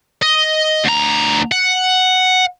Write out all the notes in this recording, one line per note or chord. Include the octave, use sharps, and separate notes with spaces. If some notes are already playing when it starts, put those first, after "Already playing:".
D#5
D2 A#5
F#5